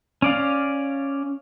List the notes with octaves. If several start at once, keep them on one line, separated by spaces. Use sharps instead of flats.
C#4 D5 F5